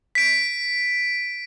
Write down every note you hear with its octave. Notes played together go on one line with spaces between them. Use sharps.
B6 D7